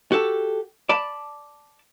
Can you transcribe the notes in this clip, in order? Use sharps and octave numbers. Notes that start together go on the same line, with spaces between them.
F#4 G4 A4
D5 A5 B5